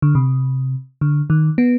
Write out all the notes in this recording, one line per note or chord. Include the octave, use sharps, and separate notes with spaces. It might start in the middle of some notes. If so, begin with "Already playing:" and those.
D3
C3
D3
D#3
B3